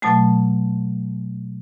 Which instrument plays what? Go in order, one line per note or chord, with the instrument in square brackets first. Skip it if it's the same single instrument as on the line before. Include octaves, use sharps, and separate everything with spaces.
[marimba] B2 F#3 A3 A5